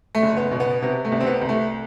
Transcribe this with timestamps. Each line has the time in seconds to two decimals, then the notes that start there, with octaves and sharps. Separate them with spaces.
0.15 A3
0.23 F#1
0.37 B3
0.51 B2
0.60 B3
0.82 C3 B3
1.05 A3
1.12 C2
1.21 C4
1.26 B3
1.42 C2
1.49 A3